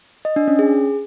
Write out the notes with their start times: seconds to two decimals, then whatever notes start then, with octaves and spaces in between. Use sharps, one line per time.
0.25 D#5
0.36 D4
0.48 C#4
0.59 G#4